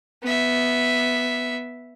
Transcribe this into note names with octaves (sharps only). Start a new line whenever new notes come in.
B3 E5